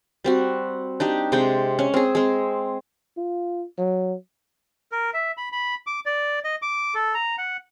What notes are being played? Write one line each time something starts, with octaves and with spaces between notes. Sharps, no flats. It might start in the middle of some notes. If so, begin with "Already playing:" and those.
G3 C4 F#4
D4 D#4 G4
C3 G#3 D5 G5
C#4
C4 G#4
G#3 C4
F4
F#3
A#4
E5
B5
B5
D6
D5
D#5
D6
A4
A#5
F#5